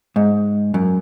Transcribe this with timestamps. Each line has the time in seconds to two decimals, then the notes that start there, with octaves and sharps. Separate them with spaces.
0.16 G#2
0.74 F#2